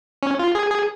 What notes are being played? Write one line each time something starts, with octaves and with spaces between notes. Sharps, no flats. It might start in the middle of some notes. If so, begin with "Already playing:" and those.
C#4
F4
G#4
G#4